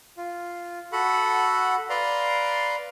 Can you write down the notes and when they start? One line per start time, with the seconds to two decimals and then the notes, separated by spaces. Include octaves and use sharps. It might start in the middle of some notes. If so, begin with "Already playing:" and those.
0.17 F4
0.92 F#4 A4 F#5 B5
1.90 B4 D5 F5 A#5 C6